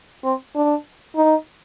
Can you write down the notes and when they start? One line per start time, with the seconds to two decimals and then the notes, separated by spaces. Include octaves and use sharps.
0.24 C4
0.55 D4
1.16 D#4